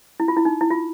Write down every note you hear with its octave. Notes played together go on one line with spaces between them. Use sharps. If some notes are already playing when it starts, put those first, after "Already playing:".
E4
F4
E4
D#4
E4
F4